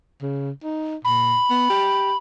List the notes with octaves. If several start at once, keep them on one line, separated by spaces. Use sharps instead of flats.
C#3
D#4
A#2 B5
B3
G4